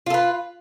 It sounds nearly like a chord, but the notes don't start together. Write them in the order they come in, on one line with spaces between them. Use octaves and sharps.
F4 A4 B4